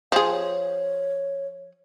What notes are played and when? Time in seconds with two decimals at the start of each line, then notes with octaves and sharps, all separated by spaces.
0.12 F3 G#4 F5
0.31 C#5